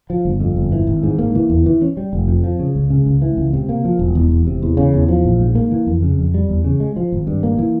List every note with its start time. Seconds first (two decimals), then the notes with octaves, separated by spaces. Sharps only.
0.10 F3
0.25 G1
0.40 F2
0.56 G1
0.72 E3
0.87 G#1
1.03 G#2
1.19 A#3
1.35 E3
1.50 E2
1.66 E3
1.82 C#4
1.97 G3
2.13 F1
2.28 F2
2.44 F3
2.59 C#3
2.75 C#2
2.90 C#3
3.06 C#2
3.22 E3
3.37 C#2
3.53 C3
3.69 A#3
3.85 F3
3.99 E1
4.15 E2
4.31 E1
4.47 C3
4.63 E2
4.77 C#3
4.94 E2
5.08 F3
5.24 A#1
5.40 G#2
5.55 A#3
5.71 E3
5.87 F2
6.02 C#3
6.18 F2
6.34 G3
6.49 E2
6.64 C#3
6.80 G#3
6.96 F3
7.12 G#1
7.27 G2
7.43 A#3
7.59 E3